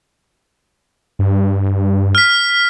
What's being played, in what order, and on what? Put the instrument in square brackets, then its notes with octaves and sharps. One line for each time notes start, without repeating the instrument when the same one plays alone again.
[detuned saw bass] G2
[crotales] F6 B6